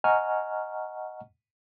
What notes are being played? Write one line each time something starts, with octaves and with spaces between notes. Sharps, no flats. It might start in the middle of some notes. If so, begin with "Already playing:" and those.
D#5 F#5 G#5 A#5 C#6 F6